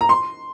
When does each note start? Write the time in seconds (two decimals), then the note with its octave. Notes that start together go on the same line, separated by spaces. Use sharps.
0.01 A#5
0.09 C6